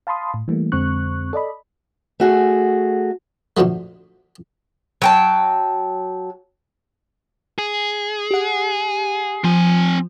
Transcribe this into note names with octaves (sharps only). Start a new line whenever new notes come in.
F5 A5 B5 C6 D#6
A2
E3 G3 A3 A#3
F2 D3 G#3 C4 C#6 F#6
A4 D5 D#5 B5
A3 F#4 G#4
A#1 D3 F3 F#3 A3
F#3 G5 A5
G#4
G4 F#5
F3 C4 G#5